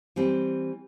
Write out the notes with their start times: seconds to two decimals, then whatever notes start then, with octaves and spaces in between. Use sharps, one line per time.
0.16 E3 G3 C4